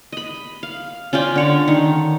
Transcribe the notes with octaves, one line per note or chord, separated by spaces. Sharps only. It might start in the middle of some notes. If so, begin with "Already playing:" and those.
D#5 B5
F5
C#4 F4 D5 G5
D3 C#5 D5
D#3 C#5